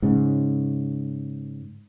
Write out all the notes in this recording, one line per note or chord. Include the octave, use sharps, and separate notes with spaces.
G#2 C#3